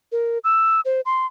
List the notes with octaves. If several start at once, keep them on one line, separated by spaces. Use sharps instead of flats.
A#4
E6
C5
C6